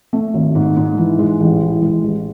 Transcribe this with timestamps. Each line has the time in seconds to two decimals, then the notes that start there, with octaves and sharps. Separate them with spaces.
0.13 A3
0.34 G#1
0.55 G#2
0.76 G#2
0.97 E3
1.19 G#3
1.40 A1
1.61 E3
1.82 G#3
2.04 A1